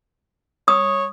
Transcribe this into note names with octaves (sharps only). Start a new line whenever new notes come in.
C#5 D#6